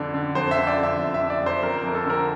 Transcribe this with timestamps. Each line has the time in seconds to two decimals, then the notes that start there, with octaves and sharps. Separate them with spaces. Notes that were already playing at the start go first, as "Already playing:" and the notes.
Already playing: F2 D3 D5
0.14 D3
0.35 F2 C5
0.51 E5
0.57 D3
0.67 D5
0.77 D3
0.83 E5
0.99 F2
1.14 E5
1.20 D3
1.30 D5
1.41 F2
1.46 C5
1.62 F2 A#4
1.78 A#4
1.84 F2
1.95 A4
2.06 D3 A#4